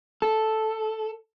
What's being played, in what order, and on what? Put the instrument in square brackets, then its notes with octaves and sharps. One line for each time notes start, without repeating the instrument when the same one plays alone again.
[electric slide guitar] A4